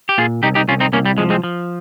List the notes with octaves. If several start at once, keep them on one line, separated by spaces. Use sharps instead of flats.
G4
A#2 F4 G#4
C2 D#4 G4
D#4 G4
C2 C#4 F4
C4 D#4
C2 A#3 C#4
G3
F3 G#3
G#3 C4
F3